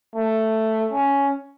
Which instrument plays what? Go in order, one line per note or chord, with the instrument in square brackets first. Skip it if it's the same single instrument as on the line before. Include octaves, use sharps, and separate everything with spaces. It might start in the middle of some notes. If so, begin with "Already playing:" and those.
[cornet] A3
C#4